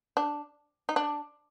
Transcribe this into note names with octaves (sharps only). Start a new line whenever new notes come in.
D4
D#4
D4